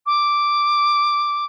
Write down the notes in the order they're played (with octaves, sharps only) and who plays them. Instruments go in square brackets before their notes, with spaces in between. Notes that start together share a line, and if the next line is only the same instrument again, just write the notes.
[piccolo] D6